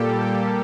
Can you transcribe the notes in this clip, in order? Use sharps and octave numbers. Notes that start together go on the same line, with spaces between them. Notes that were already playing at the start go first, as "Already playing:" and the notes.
Already playing: A#2 G3 A#3 G4 A4
G4